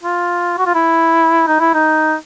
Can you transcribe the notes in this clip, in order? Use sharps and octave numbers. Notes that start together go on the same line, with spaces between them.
F4
F#4
F4
E4
D#4
E4
D#4